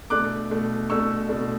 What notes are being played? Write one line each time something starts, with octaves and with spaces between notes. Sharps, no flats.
B2 A3 D4 D6 F#6
B2 A3 D4
B2 A3 D4 C#6 E6
B2 A3 D4